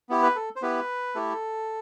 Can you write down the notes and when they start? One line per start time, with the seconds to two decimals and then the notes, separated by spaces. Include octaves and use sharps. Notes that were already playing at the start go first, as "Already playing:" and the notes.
0.09 B3 E4 G4
0.23 B4
0.36 A4
0.56 C5
0.62 B3 E4 G4 B4
1.15 A3 E4 G4 A4